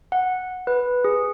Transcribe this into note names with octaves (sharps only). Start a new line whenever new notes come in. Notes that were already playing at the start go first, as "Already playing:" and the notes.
F#5
B4
G#4